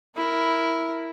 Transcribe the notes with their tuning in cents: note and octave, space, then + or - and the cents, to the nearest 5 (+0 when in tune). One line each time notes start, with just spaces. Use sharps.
E4 +0 A#4 +0